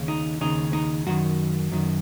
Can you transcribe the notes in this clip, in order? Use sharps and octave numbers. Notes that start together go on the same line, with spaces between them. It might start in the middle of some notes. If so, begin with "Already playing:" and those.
Already playing: D#2 C#3
D#4
D#2 C#3 D#4
D#4
F#2 D#3 F#4
F#2 D#3